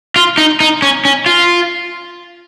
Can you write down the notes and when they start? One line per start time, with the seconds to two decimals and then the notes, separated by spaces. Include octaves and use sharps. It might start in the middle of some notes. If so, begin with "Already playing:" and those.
0.16 F4
0.38 D#4
0.60 D#4
0.82 C#4
1.05 C#4
1.26 F4